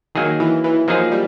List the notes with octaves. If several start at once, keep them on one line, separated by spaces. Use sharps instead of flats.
D#3 F#3 A#3 D#4 G#4
E3
E3
F3 F#3 A#3 D#4 G#4
G3